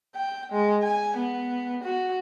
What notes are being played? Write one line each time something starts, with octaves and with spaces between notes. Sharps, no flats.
G5
G#3
G#5
B3
F#4